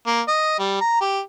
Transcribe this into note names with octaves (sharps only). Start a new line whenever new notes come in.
A#3
D#5
G3
A#5
G4